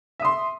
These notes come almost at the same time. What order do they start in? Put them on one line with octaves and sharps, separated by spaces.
E5 D#6 C6